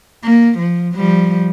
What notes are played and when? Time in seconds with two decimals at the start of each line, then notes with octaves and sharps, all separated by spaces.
0.24 A#3
0.59 F3
0.95 F3 G3